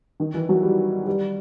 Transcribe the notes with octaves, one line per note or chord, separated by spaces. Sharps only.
D#3
E3
F#3
G3
G3